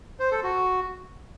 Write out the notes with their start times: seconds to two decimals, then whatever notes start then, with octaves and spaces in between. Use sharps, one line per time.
0.20 C5
0.31 A4
0.43 F#4